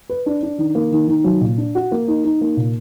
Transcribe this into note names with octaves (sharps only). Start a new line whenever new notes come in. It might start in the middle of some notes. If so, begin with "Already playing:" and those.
B4
D4
D4
D#3
A#3
D#3
D#3
F#3
A#2
D4
F#4
A#3
D#4
D#4
A#3
A#2